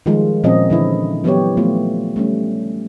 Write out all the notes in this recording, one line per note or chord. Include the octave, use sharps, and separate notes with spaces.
D#3 F3 G3 G#3 F4
A#2 F3 C4 C#4 D#5
D3 E3 E4
E3 F#3 B3 E4 G4 C#5
F3 A3 B3 F4
G3 A3 C#4